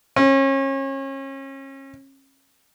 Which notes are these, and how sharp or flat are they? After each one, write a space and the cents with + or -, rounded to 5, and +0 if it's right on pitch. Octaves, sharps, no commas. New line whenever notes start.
C#4 -35